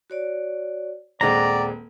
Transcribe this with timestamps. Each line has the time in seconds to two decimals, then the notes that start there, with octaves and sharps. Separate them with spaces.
0.10 F#4 C#5 D5
1.21 D#1 G#3 C4 C5 D5 F#5 G5 A#5